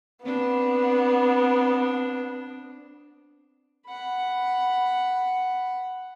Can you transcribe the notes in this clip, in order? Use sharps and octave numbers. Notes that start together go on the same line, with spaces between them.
B3 C4 D4
F#5 B5